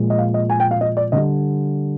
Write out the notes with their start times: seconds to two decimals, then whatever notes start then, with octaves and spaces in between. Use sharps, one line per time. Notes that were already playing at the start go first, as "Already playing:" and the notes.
Already playing: A#2 F3 G#3
0.10 D#5
0.18 F5
0.34 D#5
0.50 G#5
0.60 G5
0.71 F5
0.81 D#5
0.97 D5
1.12 D3 G3 D#5